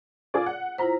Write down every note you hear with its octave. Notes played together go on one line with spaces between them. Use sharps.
F4 G#4 D5
F#5
E4 F4 C5 A#5 B6